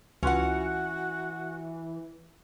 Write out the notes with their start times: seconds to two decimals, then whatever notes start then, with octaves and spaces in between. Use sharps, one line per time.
0.23 C#2 E3 C#4 F4 F#4 F#5